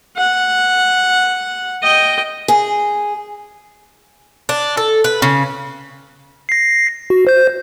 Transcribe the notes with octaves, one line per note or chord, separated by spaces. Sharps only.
F#5
D#5 G5
G#4
D4
A4
B4
C#3
A#6 C7
F#4
C5 G6